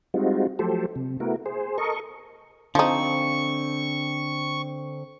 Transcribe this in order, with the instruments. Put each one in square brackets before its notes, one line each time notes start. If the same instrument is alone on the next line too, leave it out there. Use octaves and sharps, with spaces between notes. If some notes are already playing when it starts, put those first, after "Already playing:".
[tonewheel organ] G3 G#3 C4 D#4 F4 F#4
F3 F#3 A3 G4 A4 C5
C3
A3 B3 E4 F#4 A#4
G#4 C5
A4 A#4 D#5 C#6
[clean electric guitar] D3 C4 [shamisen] F3 D#4 [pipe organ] C#6